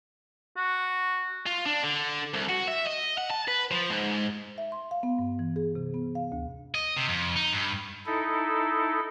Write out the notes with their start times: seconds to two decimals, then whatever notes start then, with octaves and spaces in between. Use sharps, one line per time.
0.57 F#4
1.46 F4
1.66 D4
1.83 D3
2.34 C2
2.49 F#4
2.68 E5
2.87 D#5
3.18 F#5
3.30 A5
3.48 B4
3.71 F3
3.90 G#2
4.58 E5
4.72 C6
4.91 F5
5.03 B3
5.19 G2
5.39 E3
5.56 G#4
5.75 C3
5.94 B3
6.15 F5
6.32 D2
6.75 D#5
6.96 C3
7.08 F2
7.36 D#4
7.53 G2
8.06 D#4 E4 A4